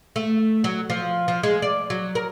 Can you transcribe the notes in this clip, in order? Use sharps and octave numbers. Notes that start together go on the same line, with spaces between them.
A3
F#3
F3
F3
G#3
D5
F#3
A#4